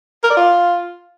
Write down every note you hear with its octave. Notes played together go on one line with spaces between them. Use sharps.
A#4
D5
F4